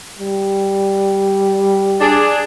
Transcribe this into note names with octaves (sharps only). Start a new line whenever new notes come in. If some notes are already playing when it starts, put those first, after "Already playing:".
G3
D4 G#4